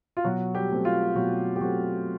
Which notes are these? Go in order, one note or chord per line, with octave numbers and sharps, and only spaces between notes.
F4
B2 F#3 F#4
G3 G4
F#3 A3 C4
F4
B2 F#3 F#4
G4
F#3 A3 C4 F#4